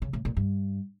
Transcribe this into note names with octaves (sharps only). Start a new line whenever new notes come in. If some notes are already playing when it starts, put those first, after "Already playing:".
C#3
A2
A#2
G2